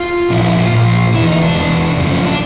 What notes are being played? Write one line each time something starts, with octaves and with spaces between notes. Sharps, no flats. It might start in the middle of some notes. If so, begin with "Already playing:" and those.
Already playing: F4
A#2 F3 E4
E4
F4
A#2 F3
E2 B2 E4
D#4
D4
E2 B2
F#2 C#3 F3
C#4
D4